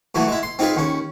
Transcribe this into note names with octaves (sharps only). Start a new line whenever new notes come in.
A#2 E3 F#3 A3
G#3 E4
C6
C4 D#4 F4 G#4 B4
D#2 C#4